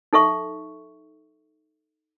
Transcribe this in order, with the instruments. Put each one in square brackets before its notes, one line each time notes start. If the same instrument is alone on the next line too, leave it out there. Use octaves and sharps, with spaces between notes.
[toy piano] D#4 A4 E5 C#6